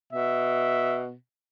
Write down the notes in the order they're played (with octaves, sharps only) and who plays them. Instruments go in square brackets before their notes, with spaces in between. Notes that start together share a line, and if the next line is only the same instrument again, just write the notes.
[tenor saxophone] B2 [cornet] E5